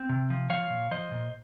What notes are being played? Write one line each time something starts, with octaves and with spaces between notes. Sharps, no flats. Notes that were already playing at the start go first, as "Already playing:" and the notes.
Already playing: C4
C3
F3
F3 C#5 F5
A#2
F3 C5 D#5
A#2